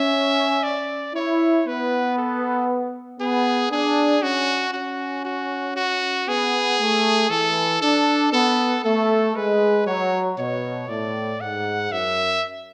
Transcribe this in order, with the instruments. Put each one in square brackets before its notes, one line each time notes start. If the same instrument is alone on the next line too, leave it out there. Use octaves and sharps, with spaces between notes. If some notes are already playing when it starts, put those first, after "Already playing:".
Already playing: [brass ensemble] C#4 [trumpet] E5
[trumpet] D5
[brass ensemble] E4 [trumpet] C#5
[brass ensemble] B3 [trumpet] B4
[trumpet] A4
[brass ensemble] B3 [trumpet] G#4
[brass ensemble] D4 [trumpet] G#4
[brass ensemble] C#4 [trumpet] F#4
[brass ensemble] C#4 [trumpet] F#4
[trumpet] F#4
F#4
[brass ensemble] B3 [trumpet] G#4
[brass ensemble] A3
[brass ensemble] E3 [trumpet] A4
[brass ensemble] D4 [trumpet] A4
[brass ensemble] B3 [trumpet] A4
[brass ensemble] A3 [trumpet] A4
[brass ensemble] G#3 [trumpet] B4
[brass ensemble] F#3 [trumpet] C#5
[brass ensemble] B2 [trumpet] C#5
[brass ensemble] A2 [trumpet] D5
[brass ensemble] G#2 [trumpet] F#5
[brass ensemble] F#2 [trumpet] E5